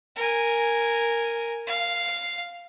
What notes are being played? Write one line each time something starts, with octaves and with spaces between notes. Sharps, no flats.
A#4 G#5
F5